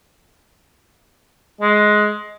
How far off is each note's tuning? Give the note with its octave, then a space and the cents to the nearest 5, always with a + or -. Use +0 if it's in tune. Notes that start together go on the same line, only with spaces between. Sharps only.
G#3 +15